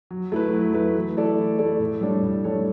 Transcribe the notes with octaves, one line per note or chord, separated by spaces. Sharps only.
F#3
A3 E4 B4
F#3
A3 E4 B4
E3
A3 E4 A4 D5
E3
A3 E4 A4 D5
A2
G3 D4 A4 C#5
A2
G3 D4 A4 C#5